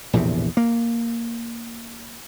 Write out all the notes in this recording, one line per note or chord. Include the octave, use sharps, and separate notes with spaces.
A#1 E2 A2 C3
A#3